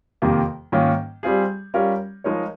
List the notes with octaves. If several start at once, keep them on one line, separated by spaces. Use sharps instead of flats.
F2 C3 D#3 A#3
G#2 D#3 A#3 C#4 F4
G3 C4 F4 G#4
G3 C#4 F4 A#4 C#5
F3 G#3 D#4 A#4 C#5